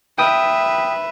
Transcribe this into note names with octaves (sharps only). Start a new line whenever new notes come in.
B4 E5 G5 D#6